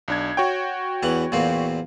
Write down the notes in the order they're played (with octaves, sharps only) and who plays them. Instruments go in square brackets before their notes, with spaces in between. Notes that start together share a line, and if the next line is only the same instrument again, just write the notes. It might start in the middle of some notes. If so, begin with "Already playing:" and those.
[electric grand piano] B1 D4 G#6
F#4 C#5 G5
[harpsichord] E2 E3 F#5
E2 A#2 C4